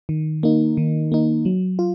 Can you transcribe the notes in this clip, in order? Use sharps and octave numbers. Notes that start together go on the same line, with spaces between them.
D#3
A#3 D#4
D#3
A#3 D#4
F#3
F4